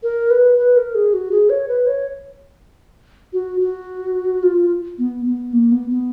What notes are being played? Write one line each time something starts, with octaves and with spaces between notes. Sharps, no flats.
A#4
B4
B4
A#4
G#4
F#4
G#4
C#5
B4
C#5
F#4
F#4
F4
B3
B3
A#3
B3
B3